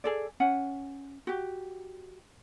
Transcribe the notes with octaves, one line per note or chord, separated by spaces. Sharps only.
G#4 A4 D5
C#4 F#5 G#5
F#4 G4